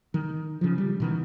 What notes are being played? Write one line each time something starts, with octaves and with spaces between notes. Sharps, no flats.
D#3
C#3 F3
G3
B2 D#3 E3